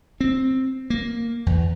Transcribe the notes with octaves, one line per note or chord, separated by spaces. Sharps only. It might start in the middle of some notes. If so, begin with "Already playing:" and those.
C4
A#3
E2